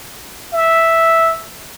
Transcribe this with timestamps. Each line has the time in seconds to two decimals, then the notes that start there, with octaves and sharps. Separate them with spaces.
0.53 E5